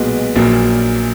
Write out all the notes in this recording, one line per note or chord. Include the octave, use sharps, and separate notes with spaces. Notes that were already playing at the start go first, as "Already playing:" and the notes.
Already playing: B1 A#2 G#3 B3 F#4
A#1 A#2 F#3 A#3